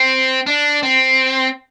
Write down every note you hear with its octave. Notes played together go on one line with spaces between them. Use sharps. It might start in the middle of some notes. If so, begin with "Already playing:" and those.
Already playing: C4
D4
C4